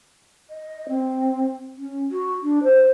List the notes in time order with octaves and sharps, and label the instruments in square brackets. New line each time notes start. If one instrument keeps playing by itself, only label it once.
[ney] D#5
C4
C#4
F#4
D4
C5